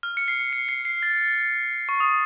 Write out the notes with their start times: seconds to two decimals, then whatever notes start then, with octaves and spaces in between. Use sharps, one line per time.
0.03 F6
0.17 C#7
0.28 C7
0.53 C#7
0.69 C7
0.85 C7
1.03 A6
1.89 C#6
2.00 D#6